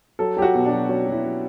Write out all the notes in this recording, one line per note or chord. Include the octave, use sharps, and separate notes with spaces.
F#3 A4
F#3 G4
F#4
B2
D4
F#3
F#3 C#4
F#3
E4
F#3